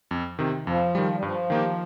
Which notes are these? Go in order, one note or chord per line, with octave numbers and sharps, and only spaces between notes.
F2
C3 D#3
F2 F3
D#3 G3
G3
G2 F3
D#3 A#3 D#4 G4